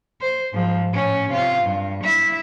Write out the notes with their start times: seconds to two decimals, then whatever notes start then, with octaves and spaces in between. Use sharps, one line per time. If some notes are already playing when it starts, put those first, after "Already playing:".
0.21 C5
0.53 G#2 F3
0.91 A2 C#4
1.29 C3 F4
1.63 G2
2.03 E4 E5